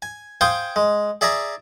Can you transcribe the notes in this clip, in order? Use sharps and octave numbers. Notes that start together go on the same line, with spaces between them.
G#5
C5 F5 G5 G#5 D#6
G#3
G#4 D5 E5 G#5 A#5